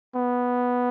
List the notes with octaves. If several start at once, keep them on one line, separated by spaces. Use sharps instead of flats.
B3